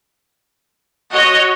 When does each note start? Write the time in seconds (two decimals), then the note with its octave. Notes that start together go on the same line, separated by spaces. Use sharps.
1.12 F#4 C#5 D#5